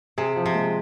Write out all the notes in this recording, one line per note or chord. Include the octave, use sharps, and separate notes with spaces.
C3 G#4
F3
C3
G#3